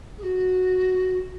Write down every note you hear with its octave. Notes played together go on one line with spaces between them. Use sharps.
G#4
F#4